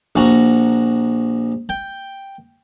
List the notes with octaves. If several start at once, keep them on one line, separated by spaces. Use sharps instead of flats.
A#1 F#4 A#5 C#6
G5